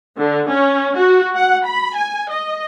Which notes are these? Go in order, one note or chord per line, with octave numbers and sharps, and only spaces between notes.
D3
C#4
F#4
F#5
B5
G#5
D#5